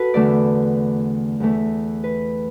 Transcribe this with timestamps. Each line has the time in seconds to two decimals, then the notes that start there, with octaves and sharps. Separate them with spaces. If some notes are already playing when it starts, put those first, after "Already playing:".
Already playing: F#4 A4 B4
0.14 E2 D3 A3 D5
1.40 E2 E3 A3
2.04 B4